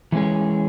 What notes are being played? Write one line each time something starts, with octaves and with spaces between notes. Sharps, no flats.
E3 G#3 C#4 G#4